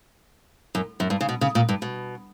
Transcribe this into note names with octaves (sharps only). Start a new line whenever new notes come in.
F#2
F#2
G2
C#3
B2
C#3
A#2
G2
B2